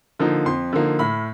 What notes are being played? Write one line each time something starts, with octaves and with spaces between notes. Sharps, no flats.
D3 F3 A#3 D#4
F2 C6
D3 F3 A#3 D#4
A2 B5